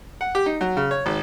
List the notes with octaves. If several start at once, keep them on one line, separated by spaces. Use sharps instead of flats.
F#5
G4
D#4
F#3
C#3
C#5
G#1